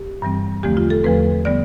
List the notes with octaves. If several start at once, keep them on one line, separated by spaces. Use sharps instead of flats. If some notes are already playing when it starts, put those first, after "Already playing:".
Already playing: G4
G2 E3 G3 C4
E2 D3 F3 A3 C4 G4
F4
A4
E2 D3 F3 A3 C4 B4
D3 G3 B3 D5